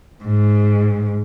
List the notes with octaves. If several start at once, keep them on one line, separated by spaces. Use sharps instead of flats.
G#2